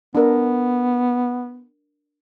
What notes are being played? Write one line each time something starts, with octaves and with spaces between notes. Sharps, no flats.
B3 D4 A#4